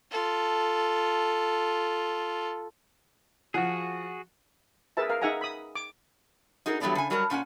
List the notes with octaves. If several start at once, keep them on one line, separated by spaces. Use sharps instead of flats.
F4 A4
F3 F#4 G#4 F#5
G#4 A#4 B4 E5 A5
A#4 F5
D#4 G#4 E5 F#5 G#5 A#5
B5 D#6
D6
D#4 F#4 G#4 A#4
E3 F#3 G3 A3 B3 D4
C#3 G#5
F#3 G3 F#4 A#4 A5
A#2 C#4 F#5 G#5